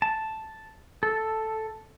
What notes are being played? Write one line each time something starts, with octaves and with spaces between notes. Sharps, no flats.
A5
A4